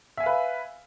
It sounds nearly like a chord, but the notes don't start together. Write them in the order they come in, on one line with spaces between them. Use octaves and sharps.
E5 G#5 F5 B4